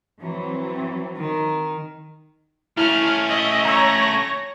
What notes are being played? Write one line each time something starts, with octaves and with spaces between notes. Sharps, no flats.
E3 F#3 C4
D#3
A3 C#4 E4 F6
D#5 E5
C#5 A#5 E6 A#6